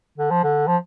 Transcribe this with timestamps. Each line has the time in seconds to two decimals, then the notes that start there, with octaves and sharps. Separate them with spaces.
0.18 D3
0.31 F3
0.44 D3
0.67 F3